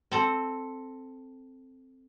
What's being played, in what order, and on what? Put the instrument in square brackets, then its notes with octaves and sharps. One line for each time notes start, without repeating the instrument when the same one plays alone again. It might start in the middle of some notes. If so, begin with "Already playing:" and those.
[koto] C4 A4